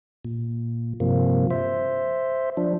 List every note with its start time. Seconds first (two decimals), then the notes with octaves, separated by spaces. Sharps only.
0.25 A#2
1.00 G2 C3 F3 A#3
1.51 C5 E5
2.57 F3 D4